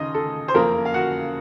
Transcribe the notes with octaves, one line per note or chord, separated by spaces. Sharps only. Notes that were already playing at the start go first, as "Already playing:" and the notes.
Already playing: D#2 C#3 D#4 D#5 C6
A4
C5
F#1 F2 C#3 F3 A#3 A#4
F5
F#4 F#5